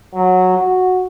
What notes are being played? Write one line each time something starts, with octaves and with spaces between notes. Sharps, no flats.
F#3
F#4